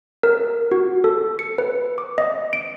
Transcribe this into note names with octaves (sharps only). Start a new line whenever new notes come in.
A#4
F#4
A4
C#7
B4
D6
D#5
D7